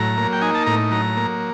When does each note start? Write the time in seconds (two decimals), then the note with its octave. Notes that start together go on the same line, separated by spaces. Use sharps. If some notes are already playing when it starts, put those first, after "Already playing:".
Already playing: A2 F#3 A#5
0.17 A#3
0.33 G5
0.41 D#4 G#5
0.54 A5
0.66 A2 A#5
0.91 F#3 A#5
1.17 A#3